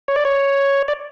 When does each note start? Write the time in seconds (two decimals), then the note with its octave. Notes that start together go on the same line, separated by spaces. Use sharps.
0.08 C#5
0.16 D5
0.25 C#5
0.88 D5